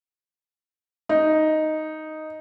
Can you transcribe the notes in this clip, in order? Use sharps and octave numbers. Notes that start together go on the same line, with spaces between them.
D#4